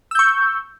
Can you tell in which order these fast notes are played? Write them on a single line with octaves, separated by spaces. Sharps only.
E6 G6 C#6